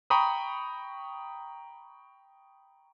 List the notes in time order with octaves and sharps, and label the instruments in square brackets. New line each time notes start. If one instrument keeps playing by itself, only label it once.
[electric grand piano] G5 A#5 B5 C#6 D#6